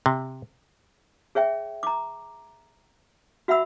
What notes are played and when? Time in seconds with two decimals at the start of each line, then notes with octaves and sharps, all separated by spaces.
0.06 C3
1.35 G#4 C#5 E5 G5
1.83 A#5 D6
3.48 F#4 E5 F#5 B5 E6